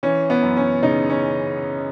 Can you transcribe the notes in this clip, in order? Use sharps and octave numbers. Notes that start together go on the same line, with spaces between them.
E3 C#4
B3
F#2
C#4
C#3 D#4
C#4